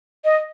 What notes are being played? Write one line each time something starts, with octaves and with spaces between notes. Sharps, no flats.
D#5